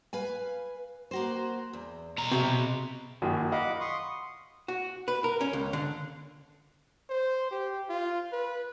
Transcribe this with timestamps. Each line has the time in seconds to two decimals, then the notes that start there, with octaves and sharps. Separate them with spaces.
0.13 B4 F5 G#5
1.11 A#3 F#4 C5
1.73 E2
2.18 B2 A#5
2.31 C3 F#4 G#4 E5
3.22 A#1 F#2 D#3
3.52 D#5 F5 F#5 B5 D6
3.80 C6 C#6 D#6
4.68 F#4
5.08 B4
5.24 A#4
5.41 C#4
5.53 C#2
5.73 D3
7.10 C5
7.51 G4
7.89 F4
8.33 B4